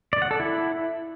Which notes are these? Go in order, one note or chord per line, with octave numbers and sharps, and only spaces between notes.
D5
F#5
A4
E4